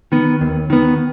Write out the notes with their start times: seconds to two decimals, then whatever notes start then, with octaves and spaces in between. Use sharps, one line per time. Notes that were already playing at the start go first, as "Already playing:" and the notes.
0.12 D#3 B3
0.41 D#2
0.70 D#3 B3